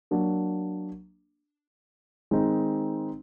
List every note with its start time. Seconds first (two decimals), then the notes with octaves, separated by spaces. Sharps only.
0.11 F#3 A#3 D4
2.31 D#3 G#3 C4 D#4